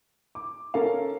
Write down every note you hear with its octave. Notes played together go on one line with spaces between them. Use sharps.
D6
C#4 A4 A#4 F5